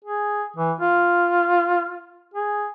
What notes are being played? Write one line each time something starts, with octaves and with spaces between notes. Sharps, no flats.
G#4
E3
F4
G#4